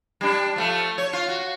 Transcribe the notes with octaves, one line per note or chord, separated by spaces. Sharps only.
G3 D4
F3 A3
C#5
F4
F#4